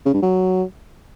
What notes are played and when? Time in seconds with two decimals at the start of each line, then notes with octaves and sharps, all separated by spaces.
0.05 C#3
0.14 G2
0.22 F#3